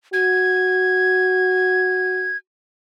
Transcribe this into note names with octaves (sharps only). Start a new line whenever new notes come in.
F#4 G#6